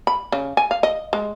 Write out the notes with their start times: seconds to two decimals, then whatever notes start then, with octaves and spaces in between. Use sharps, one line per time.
0.07 B5
0.32 C#3
0.57 G#5
0.71 F5
0.83 D#5
1.13 G#3